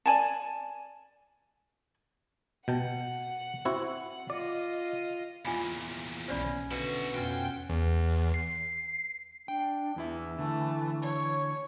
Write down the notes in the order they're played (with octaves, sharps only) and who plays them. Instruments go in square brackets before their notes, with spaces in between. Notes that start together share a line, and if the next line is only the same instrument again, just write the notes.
[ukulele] D5 G#5 A5
[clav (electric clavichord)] B2 G5 A5 [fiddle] F#5
[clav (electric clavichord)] C4 E4 F#4
[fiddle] F4 D#5 [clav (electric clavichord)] D5
[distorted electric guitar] E2 A#2 [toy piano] F4 G#5 B5
[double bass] B1 [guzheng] C#4 [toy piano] C5 D5 B5
[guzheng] B2 [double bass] D3 [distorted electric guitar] E4 F#4
[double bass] F2 B2 [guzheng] C#4 F4 F#4 [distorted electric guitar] G5
[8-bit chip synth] E2
C7
[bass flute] D4 [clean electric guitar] G5
[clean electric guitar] E2 E4 E5 [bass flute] E3
[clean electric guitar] D3 [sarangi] A3
[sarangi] C#5